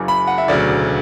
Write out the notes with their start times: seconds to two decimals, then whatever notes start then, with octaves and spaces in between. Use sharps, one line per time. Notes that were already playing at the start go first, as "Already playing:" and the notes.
Already playing: F#1 F#2 C#3 D6
0.08 B5
0.27 F#5
0.38 E5
0.47 E1 D2 C#3 F#3 D5